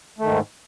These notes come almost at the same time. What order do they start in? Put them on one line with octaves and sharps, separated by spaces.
A3 D#3 G#2